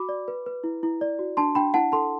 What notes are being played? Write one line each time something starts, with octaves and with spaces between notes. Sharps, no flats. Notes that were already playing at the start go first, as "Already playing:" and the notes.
Already playing: F#4 B5 D6
D5
B4
B4
E4
E4
D5
F#4
D4 A5 C6
D4 G5 B5
E4 F#5 A5
A4 A5 C6